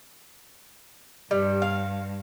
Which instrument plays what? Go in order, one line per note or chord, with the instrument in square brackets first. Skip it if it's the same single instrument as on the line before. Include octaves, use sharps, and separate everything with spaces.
[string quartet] G2 [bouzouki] G3
[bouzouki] F5